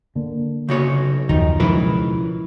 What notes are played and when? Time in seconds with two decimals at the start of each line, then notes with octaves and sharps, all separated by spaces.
0.16 D3 A#3
0.69 B1 C#3 F#4 C#5
1.29 F#1 D#2 D#3 F3 D#4
1.60 C#2 B2 F3 F#3 E4 A#4 B4